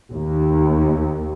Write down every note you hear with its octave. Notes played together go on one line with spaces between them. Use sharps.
D#2